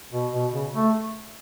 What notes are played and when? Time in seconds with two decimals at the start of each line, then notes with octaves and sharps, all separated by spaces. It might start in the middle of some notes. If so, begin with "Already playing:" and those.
0.13 B2
0.33 B2
0.53 C#3
0.74 A3